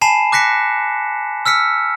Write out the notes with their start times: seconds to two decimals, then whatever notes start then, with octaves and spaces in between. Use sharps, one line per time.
0.01 G#5 A5 B5 C7 E7
0.32 D6 F#6 A#6 B6 C#7
1.46 E6 F6 B6 C#7